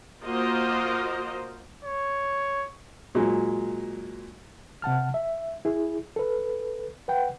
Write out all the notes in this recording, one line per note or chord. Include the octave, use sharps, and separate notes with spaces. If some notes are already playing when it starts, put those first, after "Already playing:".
A#3 F4 F#4 A#4 C5 D#5
C#5
A#2 F#3 G#3
C3 F#5 A5 F6
E5
E4 G#4
A4 B4
B4 F#5 G5